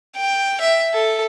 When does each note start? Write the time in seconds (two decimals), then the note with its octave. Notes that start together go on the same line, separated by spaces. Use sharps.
0.16 G5
0.61 E5
0.94 A4